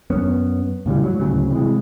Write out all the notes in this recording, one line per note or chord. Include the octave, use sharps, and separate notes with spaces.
F#2 B3 C#4
A2 C#3 E3 G3
G#2 F#3
D2 A2 C#3 F#3
C3 E3 G#3